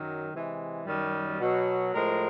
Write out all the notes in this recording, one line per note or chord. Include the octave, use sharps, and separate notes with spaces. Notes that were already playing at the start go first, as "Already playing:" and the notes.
Already playing: F#2 D#3 F#3
C3 E3 G#3
F#2 D#3 G3
B2 F#3
A2 F3 G#3 A#4